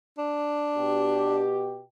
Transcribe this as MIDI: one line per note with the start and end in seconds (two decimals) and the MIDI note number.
0.18 1.42 62
0.77 1.82 47
0.77 1.82 67